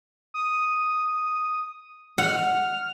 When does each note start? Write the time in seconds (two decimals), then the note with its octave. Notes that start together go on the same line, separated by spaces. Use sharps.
0.34 D#6
2.18 F#5 F6